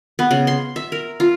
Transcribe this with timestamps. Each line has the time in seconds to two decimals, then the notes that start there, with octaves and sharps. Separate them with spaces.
0.19 B3
0.31 C#3
0.47 C6
0.76 E5
0.92 A#4
1.20 F4